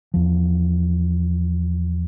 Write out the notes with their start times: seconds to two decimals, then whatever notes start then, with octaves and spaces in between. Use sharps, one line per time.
0.14 E2 F3